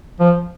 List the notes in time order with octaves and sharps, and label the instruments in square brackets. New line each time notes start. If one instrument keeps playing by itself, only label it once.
[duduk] F3